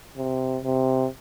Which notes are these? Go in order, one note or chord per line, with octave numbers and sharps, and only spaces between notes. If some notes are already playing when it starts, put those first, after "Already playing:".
C3
C3